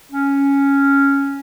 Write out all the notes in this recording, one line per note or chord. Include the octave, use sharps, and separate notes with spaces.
C#4